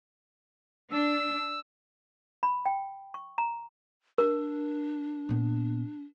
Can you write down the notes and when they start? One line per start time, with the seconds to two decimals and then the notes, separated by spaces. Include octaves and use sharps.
0.91 D4 E6
2.43 B5
2.66 G5
3.14 C#6
3.38 A#5
4.18 D4 A#4
5.29 A#2 B3